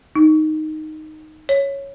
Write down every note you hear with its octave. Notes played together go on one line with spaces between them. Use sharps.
D#4
C#5